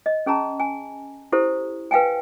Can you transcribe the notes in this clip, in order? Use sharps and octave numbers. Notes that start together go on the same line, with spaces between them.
D#5
C#4 G#4 A5 A#5
G#5
E4 G4 A4 C5
B4 F5 G5 G#5